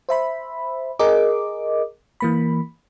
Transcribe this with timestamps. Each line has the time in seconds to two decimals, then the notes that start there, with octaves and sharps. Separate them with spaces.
0.09 C5 E5 B5
0.99 G#4 A#4 D#5 D6
2.20 E3 A#3 B5